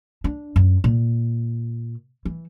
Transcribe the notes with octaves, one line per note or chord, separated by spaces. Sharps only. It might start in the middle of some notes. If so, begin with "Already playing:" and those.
D4
F#2
A#2
E3